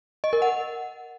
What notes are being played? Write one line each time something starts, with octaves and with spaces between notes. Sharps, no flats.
D#5
A#4
F#5